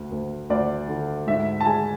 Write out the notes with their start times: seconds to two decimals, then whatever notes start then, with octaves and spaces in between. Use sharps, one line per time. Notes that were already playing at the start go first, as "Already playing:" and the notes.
Already playing: D2
0.12 D2
0.50 D2 D5
0.88 D3
1.27 G#2 E5
1.61 A5
1.66 G#3 G#5